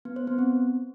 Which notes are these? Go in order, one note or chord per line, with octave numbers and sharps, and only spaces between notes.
B3
C5
B3
C4